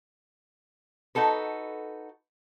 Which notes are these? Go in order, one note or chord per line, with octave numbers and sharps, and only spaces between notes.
D#4 F#4 A4 B4